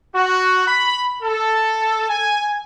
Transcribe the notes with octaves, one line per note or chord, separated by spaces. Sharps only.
F#4
B5
A4
G#5